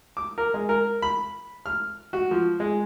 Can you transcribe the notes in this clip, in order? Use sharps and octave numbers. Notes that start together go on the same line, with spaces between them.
D6
A#4
G#3
A#4
B5
F6
F#4
F3
G#3